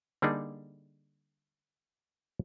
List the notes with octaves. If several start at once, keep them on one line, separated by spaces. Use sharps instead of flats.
D3 G3 A#3 D4 D#4 G#4